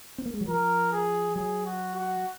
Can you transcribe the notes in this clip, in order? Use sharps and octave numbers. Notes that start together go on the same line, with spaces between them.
C4
A#3
G#3
F#3
F3 A#4
G#4
F#3 G#4
F#4
F#4